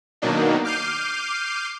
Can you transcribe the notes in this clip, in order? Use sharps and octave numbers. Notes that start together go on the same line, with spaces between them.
B2 D#3 F#3 A#3 D4 D#4
D6 F6 G6 C7 D#7